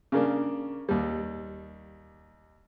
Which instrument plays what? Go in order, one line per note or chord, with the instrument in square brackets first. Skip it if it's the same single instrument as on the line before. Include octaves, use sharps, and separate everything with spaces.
[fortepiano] C#3 A#3 D4
D#2 G3